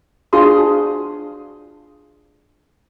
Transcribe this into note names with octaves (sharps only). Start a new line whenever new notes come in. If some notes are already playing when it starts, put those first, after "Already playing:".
D4 F4 F#4 G#4 C6 D#6